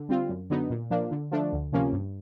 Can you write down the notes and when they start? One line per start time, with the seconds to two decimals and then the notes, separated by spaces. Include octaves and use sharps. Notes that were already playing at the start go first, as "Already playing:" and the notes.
Already playing: D3
0.09 G3 C4 F4
0.29 F#2
0.50 D3 F#3 B3 D#4
0.70 A#2
0.90 F3 A#3 D4
1.11 D3
1.31 F3 A3 D4
1.53 D2
1.72 C3 F3 A#3 C#4
1.93 G2